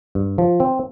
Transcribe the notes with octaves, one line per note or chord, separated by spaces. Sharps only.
G2
F3
C4